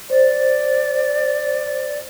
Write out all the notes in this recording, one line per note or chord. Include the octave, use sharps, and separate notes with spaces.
C5 D5